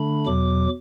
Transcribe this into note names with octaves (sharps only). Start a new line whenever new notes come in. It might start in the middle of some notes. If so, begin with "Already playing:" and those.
Already playing: D3 A3 D4 B5
E2 B2 F#3 D6